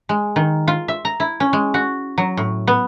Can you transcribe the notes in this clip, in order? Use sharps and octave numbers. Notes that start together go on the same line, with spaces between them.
G#3
D#3
F4
E5
A#5
E4
C#4
G#3
F#4
F#3
A2
B3